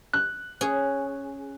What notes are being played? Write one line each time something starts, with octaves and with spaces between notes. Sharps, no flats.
F#6
C#4 G#4